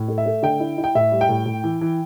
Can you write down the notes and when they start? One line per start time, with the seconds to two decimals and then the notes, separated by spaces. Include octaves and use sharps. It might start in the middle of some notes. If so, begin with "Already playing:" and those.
Already playing: A2
0.08 A3
0.18 E5
0.26 A3
0.43 D3 G5
0.60 E4
0.78 E4
0.84 G5
0.95 A2 E5
1.12 G3
1.21 G5
1.29 A2
1.46 A2
1.64 E3
1.81 E3